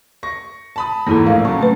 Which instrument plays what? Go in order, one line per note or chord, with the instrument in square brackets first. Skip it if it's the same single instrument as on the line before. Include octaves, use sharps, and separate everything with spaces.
[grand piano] C#6 A#6
A5 B5 D#6
[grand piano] E2 G#2 [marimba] A#3 E4 A4
[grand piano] A#1 A2 A#3 [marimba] F5
[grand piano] C#3 F#3 A5 [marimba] C#6
[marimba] A3 C#4 B4